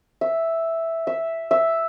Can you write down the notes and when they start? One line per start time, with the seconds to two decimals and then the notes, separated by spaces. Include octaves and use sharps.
0.21 E5
1.07 E5
1.51 E5